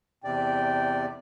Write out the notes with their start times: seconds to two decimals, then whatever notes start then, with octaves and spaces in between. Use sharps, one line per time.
0.24 E2 C3 D5 G5